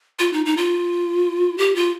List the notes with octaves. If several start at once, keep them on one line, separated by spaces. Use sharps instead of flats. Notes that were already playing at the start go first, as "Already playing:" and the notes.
F4
D#4
D#4
F4
G4
F4